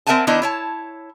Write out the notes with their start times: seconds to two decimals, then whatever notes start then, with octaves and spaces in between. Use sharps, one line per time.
0.07 C4 A#4 E5 F#5 G#5 A5
0.27 D#3 B3 D4 E4 C5 D#5
0.42 E4 C#5 A5